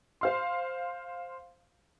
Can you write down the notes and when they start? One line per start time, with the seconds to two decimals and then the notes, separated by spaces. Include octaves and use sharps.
0.21 C5 F5 C6